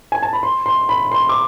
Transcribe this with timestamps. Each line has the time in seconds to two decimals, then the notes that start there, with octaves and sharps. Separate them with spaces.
0.12 G#5
0.22 A5
0.33 B5
0.43 C6
0.66 C6
0.89 B5
1.12 C6
1.29 D6